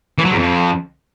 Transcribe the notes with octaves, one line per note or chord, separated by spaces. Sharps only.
E3
F#3
E2
F2